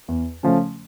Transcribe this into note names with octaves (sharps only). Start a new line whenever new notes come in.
E2
C#3 F3 A3 C#4